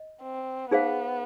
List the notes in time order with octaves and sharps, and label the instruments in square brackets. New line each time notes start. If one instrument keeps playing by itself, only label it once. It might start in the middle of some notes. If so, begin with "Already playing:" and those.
Already playing: [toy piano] D#5
[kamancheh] C4
[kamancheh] B3 [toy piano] D#4 G#4 C5 F5